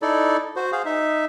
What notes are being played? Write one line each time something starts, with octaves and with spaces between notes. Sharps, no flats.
D#4 E4 A4 D5
F#4 C5
G#4 C5 F5
D#4 E5